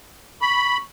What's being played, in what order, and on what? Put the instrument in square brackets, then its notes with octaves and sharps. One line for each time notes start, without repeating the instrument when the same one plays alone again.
[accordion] B5 [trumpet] C#6